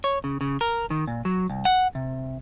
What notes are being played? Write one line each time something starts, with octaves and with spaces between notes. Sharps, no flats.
C#5
C#3
C#3
A#4
D#3
A#2
F#3
C2
F#5
C3